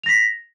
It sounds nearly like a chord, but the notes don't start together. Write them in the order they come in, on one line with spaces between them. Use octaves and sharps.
F7 A#6 B6